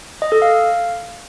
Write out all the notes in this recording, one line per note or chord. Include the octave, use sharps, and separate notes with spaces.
D#5
A4
F5